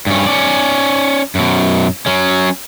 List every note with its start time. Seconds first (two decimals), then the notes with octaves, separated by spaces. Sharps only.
0.07 G2 C#4
0.27 C#4 D5
1.35 F#2 B2
2.06 F#3 C#4